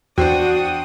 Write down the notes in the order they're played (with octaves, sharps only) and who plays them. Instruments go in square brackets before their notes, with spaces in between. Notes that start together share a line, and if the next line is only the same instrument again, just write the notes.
[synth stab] E2 [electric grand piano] D4 C5 G5 [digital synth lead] F#4 [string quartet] D#6